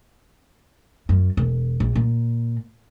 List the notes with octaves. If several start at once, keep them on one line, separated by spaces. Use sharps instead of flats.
F#2
E1
A#1
A#2